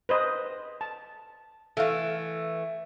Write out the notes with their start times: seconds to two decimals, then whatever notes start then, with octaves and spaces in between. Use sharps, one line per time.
0.09 B4 C5 D#5
0.81 A5
1.77 E3 A3 A4 F5